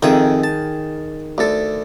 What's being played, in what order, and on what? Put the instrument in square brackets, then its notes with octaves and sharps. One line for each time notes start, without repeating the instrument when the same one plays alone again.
[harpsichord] F2 E5 [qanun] D#3 G#4
[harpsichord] A5
D2 A4